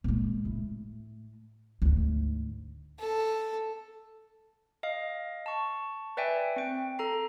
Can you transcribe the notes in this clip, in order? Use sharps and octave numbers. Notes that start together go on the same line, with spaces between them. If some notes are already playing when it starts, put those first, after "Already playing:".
A#2 G#3
A2
D2 G#2
A4
D#5 F5
A5 C#6
B4 D5 E5 G5 G#5
C4 G5
A4 A#5 C7